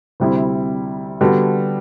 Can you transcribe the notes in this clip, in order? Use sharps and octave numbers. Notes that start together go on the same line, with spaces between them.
D2 C3 G3 C4 E4
D3 G3 B3 F#4 A4